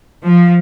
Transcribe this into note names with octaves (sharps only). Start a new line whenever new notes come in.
F3